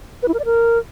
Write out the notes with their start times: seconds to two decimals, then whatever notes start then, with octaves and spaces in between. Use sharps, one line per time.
0.23 B4
0.28 E4
0.34 A#4
0.39 D5
0.45 A#4